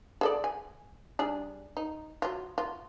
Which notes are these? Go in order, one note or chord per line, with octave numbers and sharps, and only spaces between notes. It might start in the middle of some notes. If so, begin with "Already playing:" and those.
G#4 A4 D5
G#5
G3 D4 G#4
D#4
F#3 F4
F4